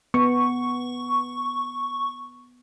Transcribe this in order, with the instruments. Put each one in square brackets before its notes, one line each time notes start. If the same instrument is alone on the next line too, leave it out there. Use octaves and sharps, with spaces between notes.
[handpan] B3 [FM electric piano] C#6